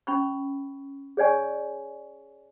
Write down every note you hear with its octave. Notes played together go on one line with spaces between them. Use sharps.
C#4 B5 C#6
G#4 C#5 D5 G#5 C#6